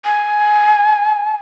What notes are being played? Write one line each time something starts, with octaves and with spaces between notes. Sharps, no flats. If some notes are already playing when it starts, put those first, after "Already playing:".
G#5